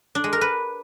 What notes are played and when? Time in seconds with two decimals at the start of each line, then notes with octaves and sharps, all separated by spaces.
0.15 D4
0.24 G#3
0.33 A#4
0.41 B4